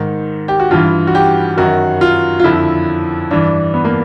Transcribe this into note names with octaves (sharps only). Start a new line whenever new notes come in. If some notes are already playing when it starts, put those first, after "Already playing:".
Already playing: G#2 D#3
G4
F#4
G2 E3 F4
F#4
G4
F#2 D#3 F#4
F4
F4
F2 D3 E4
G2 E3 D4
B3
A#3